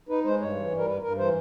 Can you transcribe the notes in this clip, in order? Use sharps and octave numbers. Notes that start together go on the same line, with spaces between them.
D#4 B4
G#3 C5
G2 C#5
E3
G3
A#4
G2 B4
G2 A#4
E3 C5